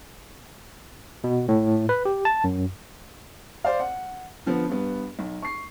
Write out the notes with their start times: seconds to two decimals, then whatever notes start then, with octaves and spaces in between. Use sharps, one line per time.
1.24 B2
1.48 A2
1.89 B4
2.05 G4
2.25 A5
2.44 F#2
3.64 C5 D5 F5
3.80 F#5
4.46 D3 F3 B3
4.70 G2 B3
5.19 B1
5.42 C#6 C7